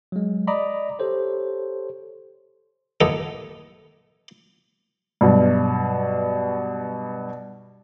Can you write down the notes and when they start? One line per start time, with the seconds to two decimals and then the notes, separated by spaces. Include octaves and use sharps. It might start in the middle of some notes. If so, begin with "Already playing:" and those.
0.12 F#3 G#3
0.47 D5 D#5 A#5 B5 D6 D#6
0.99 G4 A4 C5 C#5
3.01 D#2 A2 B3 D#4 A4
5.21 G2 B2 F#3